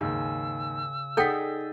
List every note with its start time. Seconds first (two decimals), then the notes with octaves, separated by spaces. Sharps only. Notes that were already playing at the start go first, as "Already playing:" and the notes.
0.01 D#2 G#2 C#3 E6
1.17 D#4 G#4 A4 D5 F#5 G5 G6 B6